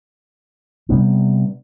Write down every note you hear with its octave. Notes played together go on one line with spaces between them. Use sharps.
C3 G3 B3 D4